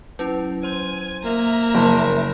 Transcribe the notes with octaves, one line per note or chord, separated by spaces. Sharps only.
F#3 C#4 E4
C5 G#5 C6 G6
A#3 E5 A#5
F#1 D7